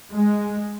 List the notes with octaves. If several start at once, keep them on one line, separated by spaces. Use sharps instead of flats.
G#3